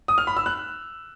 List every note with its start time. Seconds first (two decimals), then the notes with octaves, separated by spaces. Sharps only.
0.08 D#6
0.18 F6
0.27 B5
0.37 E6
0.46 F#6